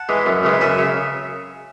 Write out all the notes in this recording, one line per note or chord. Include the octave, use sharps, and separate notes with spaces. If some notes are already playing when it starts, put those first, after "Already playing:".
Already playing: F#5 A5
E3 G#3
F#2
C#3 E3 G#3
F#2 E5 G#5
C#3